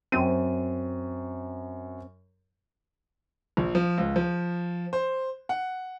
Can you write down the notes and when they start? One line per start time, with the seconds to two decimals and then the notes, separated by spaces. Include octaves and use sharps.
0.12 F#2 C4 D#7
3.57 A#1
3.75 F3
3.98 C#2
4.16 F3
4.93 C5
5.49 F#5